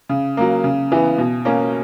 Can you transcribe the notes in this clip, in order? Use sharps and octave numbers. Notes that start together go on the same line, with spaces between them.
C#3
F#3 A#3
C#3
E3 B3
B2
A#3 C#4